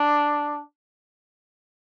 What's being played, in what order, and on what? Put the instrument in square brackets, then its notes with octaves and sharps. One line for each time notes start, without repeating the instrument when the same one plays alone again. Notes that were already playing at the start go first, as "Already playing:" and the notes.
Already playing: [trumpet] D4